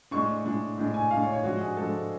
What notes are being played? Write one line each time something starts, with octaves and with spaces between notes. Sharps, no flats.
A2 G#3 D4 C#6
A2 G#3 D4
A2 G#3 D4
G#5
A2 G#3 D4 F5
C#5
C#5
G#2 F3 G#3 D4 F#4
G#4
G#2 F3 G#3 D4 A4